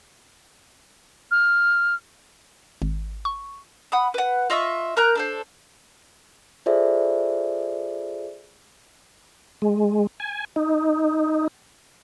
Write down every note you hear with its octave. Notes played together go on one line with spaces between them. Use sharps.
F6
G#1
C#6
F#5 B5 D#6
B4 F#5
F4 D#5 E5 C#6
A#4 A#5 F#6 G6
D4 A4 C5
F4 G#4 A4 C5 D5 E5
G#3
G#5
D#4